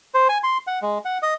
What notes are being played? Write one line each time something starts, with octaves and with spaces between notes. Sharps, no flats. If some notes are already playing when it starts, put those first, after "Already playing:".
C5
G#5
C6
F#5
G#3
F#5
D#5